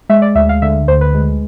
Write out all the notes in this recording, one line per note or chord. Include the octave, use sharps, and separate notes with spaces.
G#3 E5
D5
D2 E5
F5
D3 E5
D2 C5
B4
G#3